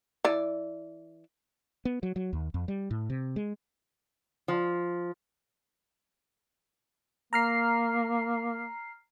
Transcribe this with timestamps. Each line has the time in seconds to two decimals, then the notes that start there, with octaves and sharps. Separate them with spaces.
0.25 E3 D5
1.85 B3
2.03 F#3
2.16 F#3
2.33 D#2
2.54 F2
2.68 G3
2.91 A2
3.10 C3
3.36 G#3
4.48 F3
7.33 A#3 A#5 F6 C7